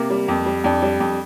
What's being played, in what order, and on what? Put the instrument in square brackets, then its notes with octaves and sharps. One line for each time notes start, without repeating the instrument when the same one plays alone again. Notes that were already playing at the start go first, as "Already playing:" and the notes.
Already playing: [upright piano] C3 A#3
G3
F2
G3
F2 D4
G3
F2